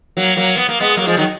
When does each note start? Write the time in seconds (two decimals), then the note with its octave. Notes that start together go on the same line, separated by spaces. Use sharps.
0.17 F#3 A#3
0.37 F#3 A#3
0.57 B3
0.69 A#3
0.80 G#3 B3
0.97 F#3 A#3
1.07 F3 G#3
1.17 D#3 F#3